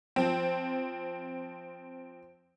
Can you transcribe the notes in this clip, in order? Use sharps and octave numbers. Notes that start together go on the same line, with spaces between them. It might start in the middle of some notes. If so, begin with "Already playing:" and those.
F3 C4